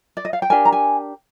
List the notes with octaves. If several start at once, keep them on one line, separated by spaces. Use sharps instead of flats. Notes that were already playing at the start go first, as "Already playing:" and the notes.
D5
D#5
F5
G5
D4 G4 A#4 G#5
A#5
G#5